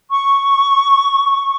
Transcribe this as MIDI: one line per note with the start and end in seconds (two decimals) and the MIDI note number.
0.09 1.56 85